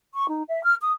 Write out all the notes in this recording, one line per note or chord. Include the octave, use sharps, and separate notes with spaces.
C#6
D#4
E5
F6
D#6